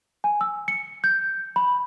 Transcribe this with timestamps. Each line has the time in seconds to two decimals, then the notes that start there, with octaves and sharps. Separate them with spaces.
0.24 G#5
0.41 E6
0.68 C#7
1.04 G6
1.56 B5